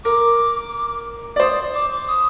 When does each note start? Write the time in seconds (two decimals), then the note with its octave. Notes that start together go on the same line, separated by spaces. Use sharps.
0.04 A#4 D6
1.36 D5
1.40 C5 D#6
1.74 D6
1.91 D6
2.08 D#6